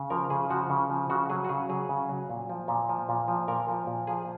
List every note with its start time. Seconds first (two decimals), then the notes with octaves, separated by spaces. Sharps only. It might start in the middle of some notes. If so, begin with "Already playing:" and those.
Already playing: C#3
0.10 F3 A#4
0.30 C#3 G#4
0.50 F3 F#4
0.70 C#3
0.90 F3
1.10 C#3 F#4
1.30 F#3 G#4
1.45 F#4
1.49 C#3 G#4
1.69 F#3 G#4
1.89 C#3
2.09 F#3
2.30 A#2
2.49 F3
2.68 A#2
2.89 F3
3.09 A#2
3.28 F3
3.48 A#2 A#4
3.68 F3
3.87 A#2
4.07 F3 G#4